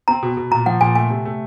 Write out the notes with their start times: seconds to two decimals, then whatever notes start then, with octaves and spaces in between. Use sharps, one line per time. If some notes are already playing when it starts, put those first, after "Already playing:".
0.08 C4 A#5
0.23 B2
0.37 B2
0.51 A#2 A#5
0.66 F3 F#5
0.81 A#2 G#5
0.95 A3 G#5
1.10 C3
1.25 A3